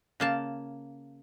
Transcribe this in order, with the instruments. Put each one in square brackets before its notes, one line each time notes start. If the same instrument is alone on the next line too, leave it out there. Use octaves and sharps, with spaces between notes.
[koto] C#3 A#3 A5